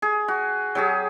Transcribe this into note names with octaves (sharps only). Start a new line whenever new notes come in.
G#4
F#4
F#3 G4 G#4